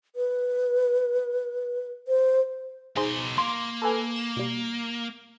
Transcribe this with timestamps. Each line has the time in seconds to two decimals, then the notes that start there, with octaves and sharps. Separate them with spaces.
0.16 B4
2.08 C5
2.96 B2 D#4 G#4 C5 C6
3.38 A#3 C6
3.82 A4 B4 G#5
4.16 E7
4.37 B2 G3